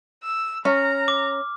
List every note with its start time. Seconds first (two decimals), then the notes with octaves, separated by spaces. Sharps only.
0.23 E6
0.65 C#4 A#5 F6
1.08 D6